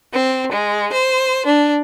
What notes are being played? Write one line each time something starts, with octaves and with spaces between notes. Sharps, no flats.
C4
G#3
C5
D4